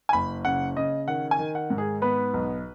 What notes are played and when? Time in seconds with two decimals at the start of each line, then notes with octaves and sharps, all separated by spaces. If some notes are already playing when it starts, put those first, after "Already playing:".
0.09 G#5
0.13 F#1 B5
0.45 C#3 F#5
0.76 C#3 D#5
1.08 D#3 F#5
1.31 G#5
1.39 D#3
1.55 F#5
1.70 G#2
1.78 G#4
2.02 B3 B4
2.34 B1